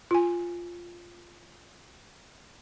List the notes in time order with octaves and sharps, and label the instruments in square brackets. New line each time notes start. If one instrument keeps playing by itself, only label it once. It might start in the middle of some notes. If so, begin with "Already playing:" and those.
[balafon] F4 G#5